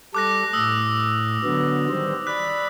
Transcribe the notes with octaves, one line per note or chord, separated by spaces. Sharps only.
G3 A4 D6 F#6 A#6
A2 D#6 E6
D3 F#3 B3
D#3 G3 C5
D5 B5 F#6